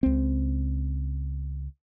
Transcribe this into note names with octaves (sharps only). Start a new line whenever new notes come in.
C#2 C4